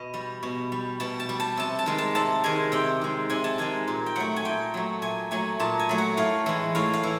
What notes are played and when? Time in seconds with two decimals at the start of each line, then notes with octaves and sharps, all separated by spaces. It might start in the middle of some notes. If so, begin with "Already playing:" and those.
Already playing: B2 D#5
0.14 G3
0.43 B2
0.72 G3
1.00 B2 A5
1.20 A5
1.29 G3
1.40 A5
1.57 C3 A5
1.79 A5
1.86 D#3 G#3
1.98 A5
2.15 C3 A5
2.44 D#3 G#3 G#5
2.72 C3 G5
3.01 D#3 G#3
3.30 C3 G#5
3.44 A5
3.58 D#3 G#3 G#5
3.88 A#2
4.06 G5
4.16 F#3 A3 F#5
4.36 G#5
4.45 A#2 G5
4.74 F#3 A3
5.02 A#2 G#5
5.31 F#3 A3 G#5
5.60 A#2 A5
5.79 G#5
5.89 F#3 A3
5.98 F#5
6.17 A2 F5
6.46 E3 G#3
6.75 A2 F5
6.93 F5
7.03 E3